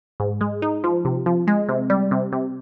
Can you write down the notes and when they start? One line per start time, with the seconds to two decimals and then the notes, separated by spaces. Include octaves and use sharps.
0.20 G#2
0.41 G#3
0.62 D#4
0.84 F3
1.05 C3
1.26 F3
1.47 G#3
1.69 C3
1.90 G3
2.11 C3
2.33 C3